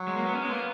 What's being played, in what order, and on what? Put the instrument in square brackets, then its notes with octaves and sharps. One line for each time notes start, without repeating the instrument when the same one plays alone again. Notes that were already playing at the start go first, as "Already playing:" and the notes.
Already playing: [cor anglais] F#3
[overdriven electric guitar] G#3
A#3
B3
C#4
[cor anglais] G#3 [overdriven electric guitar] B3
[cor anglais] A#3